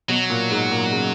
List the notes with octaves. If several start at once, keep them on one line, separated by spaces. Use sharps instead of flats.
B2 F#3
A#2
G#2
A#2
C#3